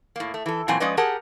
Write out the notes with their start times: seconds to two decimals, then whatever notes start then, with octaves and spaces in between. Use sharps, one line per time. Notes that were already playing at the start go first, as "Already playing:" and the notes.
0.16 A2 A#3
0.34 A3
0.46 E3 A4
0.68 A#2 E3 F#3 C4 G#5
0.80 F3 G#3 C#4 B4 D5 D#5
0.97 G4 G#4 A#4 F#5 A5